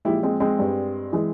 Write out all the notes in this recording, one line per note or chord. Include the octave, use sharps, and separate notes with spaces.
A#2 F3 G#3 E4 G4
G#3 C4
G#3 C4
G2 G3
E3 G#3